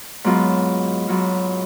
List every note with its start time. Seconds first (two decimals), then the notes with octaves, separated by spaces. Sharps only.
0.24 G#2 F#3 B3 F4
1.08 G#2 F#3 B3 F4